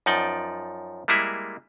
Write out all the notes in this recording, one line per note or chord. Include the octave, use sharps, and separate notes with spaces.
F#2 F3 D#4 D5 G5
G3 G#3 A#3 E4 G#4 E5